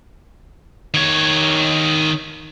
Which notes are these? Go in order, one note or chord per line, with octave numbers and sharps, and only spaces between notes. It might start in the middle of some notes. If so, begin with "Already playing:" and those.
D#3 C#5